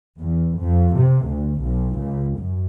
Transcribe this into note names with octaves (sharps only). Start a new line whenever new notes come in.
E2
F2
C3
D2
B1
C#2
F#2